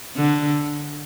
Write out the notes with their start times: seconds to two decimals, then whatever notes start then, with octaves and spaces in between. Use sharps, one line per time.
0.16 D3